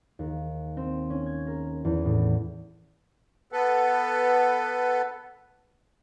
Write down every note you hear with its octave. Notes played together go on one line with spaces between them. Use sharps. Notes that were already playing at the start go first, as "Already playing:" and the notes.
D#2
C4
C#4
G#6
A#4
E2
A2
B3 A4 B4